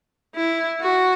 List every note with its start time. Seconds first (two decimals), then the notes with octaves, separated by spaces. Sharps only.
0.35 E4
0.82 F#4